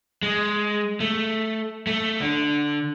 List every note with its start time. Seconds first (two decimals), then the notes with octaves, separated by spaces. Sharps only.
0.23 G#3
1.00 A3
1.87 A3
2.21 D3